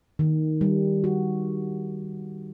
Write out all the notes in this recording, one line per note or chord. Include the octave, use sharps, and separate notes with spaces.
D#3
G3
F#4